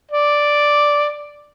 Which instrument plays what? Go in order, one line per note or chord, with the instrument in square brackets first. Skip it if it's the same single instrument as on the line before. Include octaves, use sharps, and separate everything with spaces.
[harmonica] D5